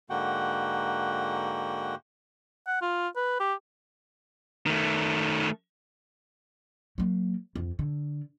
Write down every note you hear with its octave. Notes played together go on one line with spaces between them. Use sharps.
G#2 D3 A#3 F#4 F#5 G5
F#5
F4
B4
G4
D#3 A3
F#3 A#3
F2
D3